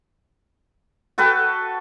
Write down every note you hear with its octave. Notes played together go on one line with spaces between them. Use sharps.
F#4 A4 B4 G5